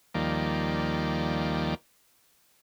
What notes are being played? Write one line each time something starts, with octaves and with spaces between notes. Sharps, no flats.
D#2 D#3 F3 G3 A#3 D5